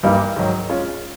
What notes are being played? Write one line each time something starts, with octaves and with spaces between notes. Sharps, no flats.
G2 E3 G3 A#3 D#4
G#2 D#3 F#3
G#3 C#4 F4